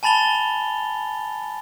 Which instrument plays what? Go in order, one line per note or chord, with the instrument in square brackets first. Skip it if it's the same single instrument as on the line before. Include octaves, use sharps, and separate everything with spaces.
[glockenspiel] G#5 A5 B5 A6 F7 G7